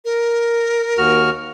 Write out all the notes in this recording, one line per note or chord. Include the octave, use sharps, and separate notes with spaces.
A#4
D#2 F#4 F6